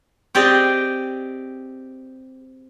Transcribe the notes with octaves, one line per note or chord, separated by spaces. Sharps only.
C4 G4 G#4 D5 D#5